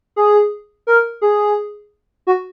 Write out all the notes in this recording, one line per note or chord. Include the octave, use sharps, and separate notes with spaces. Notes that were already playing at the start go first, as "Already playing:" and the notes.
G#4
A#4
G#4
F#4